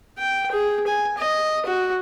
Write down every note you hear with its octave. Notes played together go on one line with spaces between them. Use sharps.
G5
G#4
G#5
D#5
F#4